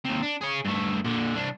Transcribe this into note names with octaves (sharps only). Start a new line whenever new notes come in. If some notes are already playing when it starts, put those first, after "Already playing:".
D#2 C3
D4
G#4 C#5
G2 A3
A#2 D3
C2 D4